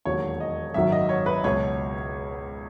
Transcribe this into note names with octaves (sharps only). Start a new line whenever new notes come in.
E1 D#2 D#3 F#3 C#5
D#5
G#1 F#2 D#3 F#3 E5
D#5
C#5
B4
C#2 B2 F#3 C#5